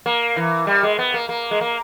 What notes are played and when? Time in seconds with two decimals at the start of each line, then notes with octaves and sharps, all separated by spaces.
0.06 A#3
0.36 E3
0.67 G3
0.83 G#3
0.99 B3
1.14 A#3
1.29 A#3
1.51 G#3
1.61 A#3